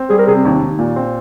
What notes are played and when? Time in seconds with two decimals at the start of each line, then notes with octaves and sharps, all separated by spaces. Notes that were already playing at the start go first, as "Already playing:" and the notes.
Already playing: C4
0.10 G3 G#4
0.18 A#4
0.27 C3 G#4
0.36 C4
0.45 D#2
0.61 D#2
0.79 A#2
0.96 C4